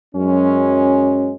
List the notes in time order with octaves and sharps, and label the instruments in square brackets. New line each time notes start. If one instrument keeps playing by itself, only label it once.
[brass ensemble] F#2 F#3 G#3 C#4